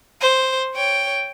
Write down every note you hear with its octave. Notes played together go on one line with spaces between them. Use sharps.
C5
C#5 G5